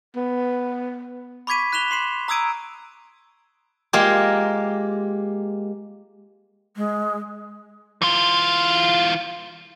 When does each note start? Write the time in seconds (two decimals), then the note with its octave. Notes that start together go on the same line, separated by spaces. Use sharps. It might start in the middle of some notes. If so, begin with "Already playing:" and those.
0.16 B3
1.47 B5 C#6 D6 G#6 B6 D#7
1.73 F#6 B6 E7 F7 G7
1.91 C6 C7 E7
2.28 A#5 D#6 E6 G#6 D7 D#7
3.93 G#3 A#3 F4 G4
6.76 G#3
8.02 E3 F4